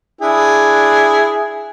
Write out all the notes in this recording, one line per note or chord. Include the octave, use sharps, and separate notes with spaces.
D4 E4 G#4